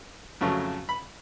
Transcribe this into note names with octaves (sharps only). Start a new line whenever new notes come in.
F2 C#3 F#3 A3
B5